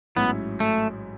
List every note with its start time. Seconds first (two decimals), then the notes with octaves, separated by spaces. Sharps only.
0.16 A1 G#2 F#3 B3 C#4 E4
0.60 A3